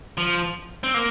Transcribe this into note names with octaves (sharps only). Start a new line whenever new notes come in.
F3
C4
A#3